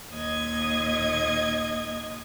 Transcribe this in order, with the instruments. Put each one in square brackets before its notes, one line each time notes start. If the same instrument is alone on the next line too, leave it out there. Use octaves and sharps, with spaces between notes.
[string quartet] D#2 A#2 D#5 G#6